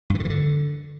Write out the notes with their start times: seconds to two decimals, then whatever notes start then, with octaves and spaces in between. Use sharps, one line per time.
0.10 G2
0.15 E3
0.20 D3
0.25 E3
0.30 D3